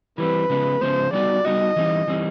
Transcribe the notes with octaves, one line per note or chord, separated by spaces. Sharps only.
E3 G3 C4 B4
C#3 F3 G#3 B3
C#3 F3 G#3 B3 C5
G3 B3 D#4 F#4 D5
G3 B3 D#4 F#4 D#5
E3 G3 C4 D#4
E3 G3 C4 D#4